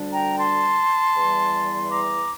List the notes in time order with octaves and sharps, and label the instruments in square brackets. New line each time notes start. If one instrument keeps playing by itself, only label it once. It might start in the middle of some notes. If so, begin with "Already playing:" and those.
Already playing: [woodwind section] D2 D3 G3 D4
G5 A#5
A5 C6
E2 E3 G3
A#5 D6